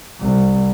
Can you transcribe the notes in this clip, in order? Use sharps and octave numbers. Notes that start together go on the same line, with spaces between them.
C2